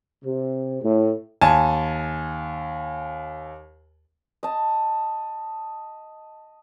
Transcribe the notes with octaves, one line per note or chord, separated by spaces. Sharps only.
C3
A2
D#2 G#5 A5
D#5 A5